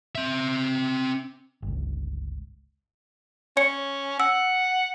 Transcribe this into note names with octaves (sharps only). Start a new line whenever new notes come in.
C4 E5
G1 C#2
C#4 C#5 C#7
F#5 E6